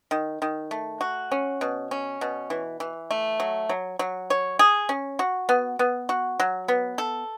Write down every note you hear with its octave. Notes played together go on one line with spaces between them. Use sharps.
D#3
D#3
A3
F#4
C#4
B2
C#4
B2
E3
E3
A3
F#3
F#3
F#3
C#5
G#4
C#4
F#4
B3
B3
F#4
F#3
B3
A4